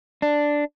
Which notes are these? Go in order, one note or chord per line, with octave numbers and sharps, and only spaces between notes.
D4